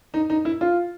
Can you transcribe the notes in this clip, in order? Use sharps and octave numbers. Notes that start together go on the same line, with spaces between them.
D#4
D#4
E4
F4